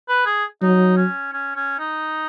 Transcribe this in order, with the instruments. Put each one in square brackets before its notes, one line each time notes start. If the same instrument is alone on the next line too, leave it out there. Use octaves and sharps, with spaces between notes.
[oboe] B4
G#4
[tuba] F#3 [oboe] D#4
[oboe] C#4
C#4
C#4
D#4